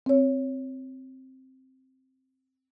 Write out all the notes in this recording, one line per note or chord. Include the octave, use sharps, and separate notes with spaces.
C4 C#5